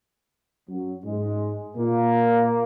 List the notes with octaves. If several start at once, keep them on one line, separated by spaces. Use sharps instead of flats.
F#2 F#3
G#2 G#3
A#2 A#3